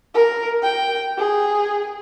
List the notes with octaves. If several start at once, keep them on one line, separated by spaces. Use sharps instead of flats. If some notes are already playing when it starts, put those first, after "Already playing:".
A#4
G5
G#4